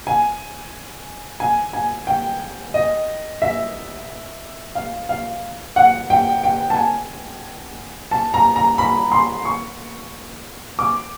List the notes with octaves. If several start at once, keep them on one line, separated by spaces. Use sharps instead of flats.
G#5
G#5
G#5
G5
D#5
E5
F5
F5
F#5
G5
G5
A5
G#5
A5
A#5
A#5
B5
C6
C#6
D6